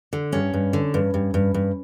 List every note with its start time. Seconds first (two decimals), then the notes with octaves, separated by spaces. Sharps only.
0.13 D3
0.32 G2 C#4
0.54 G2
0.73 D3
0.94 G2
1.14 G2
1.34 G2
1.54 G2